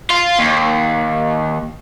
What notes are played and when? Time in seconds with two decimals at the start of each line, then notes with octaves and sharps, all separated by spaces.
0.10 F4
0.39 D#2